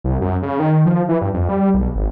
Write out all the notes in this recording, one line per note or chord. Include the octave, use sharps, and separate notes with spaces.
C2
F#2
C#3
D#3
F3
E3
G2
F2
G3
B1
G#1